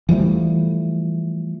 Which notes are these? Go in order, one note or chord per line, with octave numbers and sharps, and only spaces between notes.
E3 F3 G3 A3